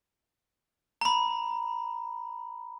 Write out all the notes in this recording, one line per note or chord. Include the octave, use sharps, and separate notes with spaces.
A#5 B5